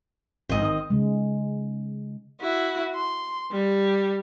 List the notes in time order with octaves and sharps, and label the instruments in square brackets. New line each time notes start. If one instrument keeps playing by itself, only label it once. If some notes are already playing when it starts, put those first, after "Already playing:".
[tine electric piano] A1 G#2 [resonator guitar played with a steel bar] C4 D#5
[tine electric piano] D#3 D#6
[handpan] C#3 G#3
[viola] E4 F#4
C6
G3